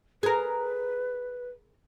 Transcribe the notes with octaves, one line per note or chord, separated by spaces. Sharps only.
G#4 A#4 B4